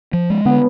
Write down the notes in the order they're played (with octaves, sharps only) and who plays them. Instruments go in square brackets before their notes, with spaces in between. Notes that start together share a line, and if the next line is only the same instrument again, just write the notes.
[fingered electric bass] F3
G#3
[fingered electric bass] D3 [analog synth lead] B3